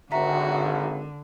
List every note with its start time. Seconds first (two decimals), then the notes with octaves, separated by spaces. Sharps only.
0.12 G#1 D3 F#4 E5 A#5 B6